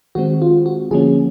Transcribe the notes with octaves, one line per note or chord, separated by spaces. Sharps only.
D#3 G#3 C4 F#4
F4
F#4
D3 F3 A#3 C#4 G#4